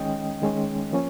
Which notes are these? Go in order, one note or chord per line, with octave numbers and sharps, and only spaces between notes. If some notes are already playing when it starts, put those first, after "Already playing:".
Already playing: D#3 G#3 C#4 D#5 G5
D#3 G#3 C#4
F3 A#3 C#4